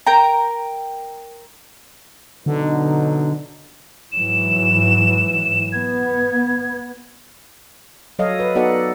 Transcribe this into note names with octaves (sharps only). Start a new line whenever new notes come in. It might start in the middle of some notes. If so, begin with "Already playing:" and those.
A#4 G5 A#5
B2 D3 F#3 D#4
G#2 E3 F#3 E7
B3 G#6
F#3 A4 C#5 D#5 F5
B4
B3 D#4 F#4 A4 D5 F#5